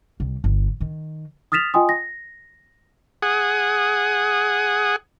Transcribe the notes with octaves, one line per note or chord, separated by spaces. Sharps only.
C2
G1
D#3
D#6 F6 A6 B6 E7 F7
F4 D#5 G5 G#5 C6 D#6
A#6
G#4 F#5 D#6